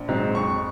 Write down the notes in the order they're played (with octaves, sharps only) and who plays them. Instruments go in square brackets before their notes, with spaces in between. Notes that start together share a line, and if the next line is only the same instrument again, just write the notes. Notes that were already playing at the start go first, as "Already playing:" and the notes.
Already playing: [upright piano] A#1
G#2 F#3 C4 D#4
F2 C#6